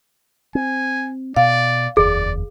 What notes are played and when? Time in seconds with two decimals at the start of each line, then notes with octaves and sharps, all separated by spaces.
0.55 C4 G#5
1.36 B2 D5 F5
1.97 F1 D#2 G#4 D5